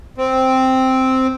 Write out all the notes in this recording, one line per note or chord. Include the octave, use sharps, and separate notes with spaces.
C4